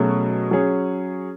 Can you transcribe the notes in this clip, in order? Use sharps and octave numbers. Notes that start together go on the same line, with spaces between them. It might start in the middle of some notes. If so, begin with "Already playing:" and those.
Already playing: B2 F#3 A3 C#4 G#4
F#3 C#4 G#4 C#5